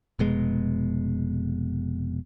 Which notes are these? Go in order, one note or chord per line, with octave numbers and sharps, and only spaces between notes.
F1 B2 G#3